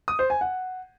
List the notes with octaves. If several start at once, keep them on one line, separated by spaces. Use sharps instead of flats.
D#6
C5
G#5
F#5